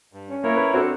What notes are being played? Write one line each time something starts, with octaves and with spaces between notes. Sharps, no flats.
G2
C#4
A#3 E4 A#4 C#5
B4
C4 D4 F#4 A4